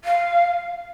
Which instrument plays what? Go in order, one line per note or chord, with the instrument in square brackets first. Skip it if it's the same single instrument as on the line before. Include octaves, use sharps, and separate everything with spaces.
[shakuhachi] F5